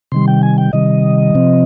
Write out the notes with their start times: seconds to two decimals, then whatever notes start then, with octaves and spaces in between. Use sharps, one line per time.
0.12 C3 D#3 G3 C6
0.28 G5
0.43 G#5
0.58 G5
0.73 C3 D#3 G3 D#5
1.35 C3 F3 C4